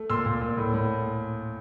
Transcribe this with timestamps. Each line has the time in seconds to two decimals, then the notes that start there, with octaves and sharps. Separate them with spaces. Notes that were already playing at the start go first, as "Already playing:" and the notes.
Already playing: A3
0.10 A#2 C6 E6
0.26 A#2
0.41 A#2
0.57 A2
0.74 A2